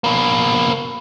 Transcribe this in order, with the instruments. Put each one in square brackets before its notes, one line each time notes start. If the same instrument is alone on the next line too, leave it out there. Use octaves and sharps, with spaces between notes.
[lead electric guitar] B2 A#3